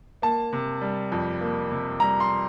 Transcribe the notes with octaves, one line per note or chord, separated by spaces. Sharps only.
A#3 A5
C3
G3
F2
A#3
C3
G3 A#5
C6